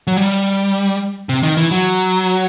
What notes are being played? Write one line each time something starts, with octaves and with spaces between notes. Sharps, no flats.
F#3
G3
C3
D#3
E3
F#3